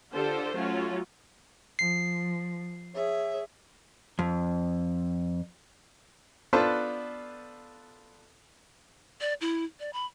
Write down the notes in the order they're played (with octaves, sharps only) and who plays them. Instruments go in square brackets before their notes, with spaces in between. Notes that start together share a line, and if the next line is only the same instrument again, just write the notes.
[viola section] D3 F4 G4 A4 C5
F#3 A3 C#4 F4
[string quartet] F3 [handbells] C7
[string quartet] G#4 C#5 E5
[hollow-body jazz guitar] F2
[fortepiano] B3 D4 F4 A4 B4 C5
[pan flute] D5
E4
D5
B5